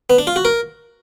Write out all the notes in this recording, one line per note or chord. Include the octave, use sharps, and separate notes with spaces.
B3
D4
F4
F#4
A#4